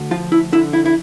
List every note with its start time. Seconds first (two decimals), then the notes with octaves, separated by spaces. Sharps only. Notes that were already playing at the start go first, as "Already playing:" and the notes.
Already playing: D2
0.11 F3 F4
0.32 E4
0.52 D3 E4
0.73 E4
0.86 E4